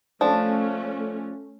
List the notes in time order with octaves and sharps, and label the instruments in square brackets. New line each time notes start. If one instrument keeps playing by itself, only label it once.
[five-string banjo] F3 D4 [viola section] A3 C#4